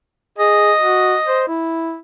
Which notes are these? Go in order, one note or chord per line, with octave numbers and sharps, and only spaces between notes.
G#4 D#5
F#4
C5
E4